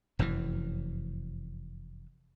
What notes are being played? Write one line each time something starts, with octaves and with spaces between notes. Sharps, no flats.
F1 F#2 C3 E3